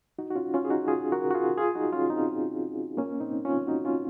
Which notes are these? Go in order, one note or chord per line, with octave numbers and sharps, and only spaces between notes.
D#4 F#4
F#4
C#4 F4
C#4 F4
G#4
D#4 F#4
F4 G#4
F#4 A#4
F#4
F4 G#4
F4 G#4
D#4 F#4
C#4 F4
C4 D#4
A#3 C#4
C4 D#4
C#4 F4
D#4 F#4
C#4 F4